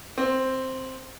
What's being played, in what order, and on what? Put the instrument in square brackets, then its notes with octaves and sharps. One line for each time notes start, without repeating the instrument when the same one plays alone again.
[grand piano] C4